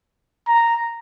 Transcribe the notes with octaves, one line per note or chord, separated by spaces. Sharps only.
A#5